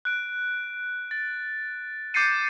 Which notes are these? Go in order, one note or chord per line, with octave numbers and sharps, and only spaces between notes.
F#6 D7
A6
D6 G6 A6 C7 C#7 D#7